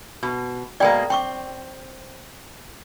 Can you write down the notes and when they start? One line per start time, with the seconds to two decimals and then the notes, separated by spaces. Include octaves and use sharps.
0.23 B2
0.80 B2 G#3 A#3 D5 G5
1.10 C4 G5 C#6 D6